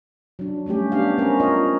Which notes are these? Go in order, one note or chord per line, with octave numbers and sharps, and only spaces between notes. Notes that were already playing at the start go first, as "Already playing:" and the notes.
F#3 D4
G3 A3 C#4 G4
B3 D4 G4 F5
C4 C#4 G4 A#4
F4 A#4 C#5 D#5